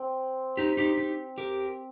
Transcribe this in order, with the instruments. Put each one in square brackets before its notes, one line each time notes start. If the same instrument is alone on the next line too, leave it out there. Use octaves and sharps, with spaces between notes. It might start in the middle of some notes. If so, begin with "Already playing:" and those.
Already playing: [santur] C4
[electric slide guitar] D#4 G4
D#4 G4
D#4 G4
G4 A#4